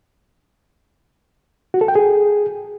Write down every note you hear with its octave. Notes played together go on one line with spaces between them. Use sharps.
F#4
A4
G5
G#4